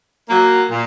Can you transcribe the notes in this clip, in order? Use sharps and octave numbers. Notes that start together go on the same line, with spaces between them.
F#3 A#3
A#2